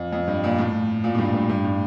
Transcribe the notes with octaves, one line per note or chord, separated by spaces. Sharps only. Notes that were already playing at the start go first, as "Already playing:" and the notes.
Already playing: F2
F2
G2
A#2
A2
A#2
A2
G2
G2
G2
A2